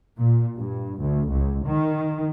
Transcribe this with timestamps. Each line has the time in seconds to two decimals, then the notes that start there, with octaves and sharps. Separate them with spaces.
0.19 A#2
0.58 G2
1.01 D2
1.31 C#2
1.66 D#3